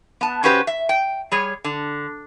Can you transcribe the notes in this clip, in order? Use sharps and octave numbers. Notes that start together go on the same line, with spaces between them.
B3 A5
C#3 C#4 F#4 G4 B4 C5
E5
G5
G3 G#4 C#5
D3